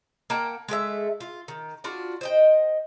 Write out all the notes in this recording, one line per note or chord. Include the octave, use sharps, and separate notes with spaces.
A#3 F#5 G5 A5
G#3 A3 A#4 E5
F4
D#3
D4 F4 F#4
C5 D#5 G5